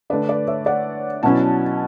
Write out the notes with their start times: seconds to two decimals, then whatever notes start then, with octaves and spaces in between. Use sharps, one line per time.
0.10 D3 A3 D4 B4 D5
0.29 B4 D5
0.47 C#5 E5
0.66 D5 F#5
1.23 B2 F#3 C#4 E4 F#5 A5